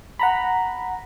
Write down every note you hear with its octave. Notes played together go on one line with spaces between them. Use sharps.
F#5 A#5 B5